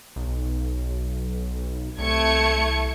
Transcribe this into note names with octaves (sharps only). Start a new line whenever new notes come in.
B1
C2 A3 G#6 C#7